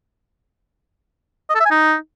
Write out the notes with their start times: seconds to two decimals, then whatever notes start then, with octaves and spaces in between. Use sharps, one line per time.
1.50 D#5
1.55 A4
1.60 E5
1.66 G#5
1.71 D#4